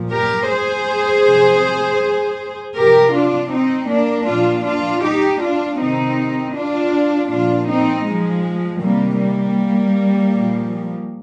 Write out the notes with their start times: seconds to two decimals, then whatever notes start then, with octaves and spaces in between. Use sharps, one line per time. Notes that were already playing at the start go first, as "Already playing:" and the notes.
Already playing: A#2 F3
0.12 G4 A#4
0.49 G#4 C5
1.25 C3 F3
2.77 C3 F3 G4 A#4
3.14 D4 F4
3.52 C4 D#4
3.89 A#3 D4
4.28 A#2 F3 D4 F4
4.66 D4 F4
5.04 D#4 G4
5.42 D4 F4
5.79 C3 D#3 C4 D#4
6.55 D4 F4
7.31 A#2 F3 D4 F4
7.68 C4 D#4
8.07 F3 G#3
8.83 C3 D#3 G3 A#3
9.20 G3 A#3
10.34 A#2 F3